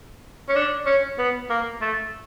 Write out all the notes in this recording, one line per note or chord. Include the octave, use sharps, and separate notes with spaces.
C#4
D4
C#4
B3
A#3
A3